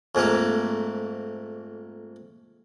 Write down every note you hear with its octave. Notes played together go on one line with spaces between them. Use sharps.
F2 G#2 A3 A#3